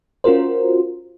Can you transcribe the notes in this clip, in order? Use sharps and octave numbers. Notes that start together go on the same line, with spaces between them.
C#4 F4 F#4 A#4 C5